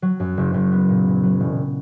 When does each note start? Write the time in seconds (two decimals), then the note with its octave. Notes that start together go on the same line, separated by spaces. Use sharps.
0.02 F#3
0.20 F#2
0.37 F#1
0.54 F#1
0.72 B3
0.89 A#2
1.06 A#2
1.23 F#3
1.40 E1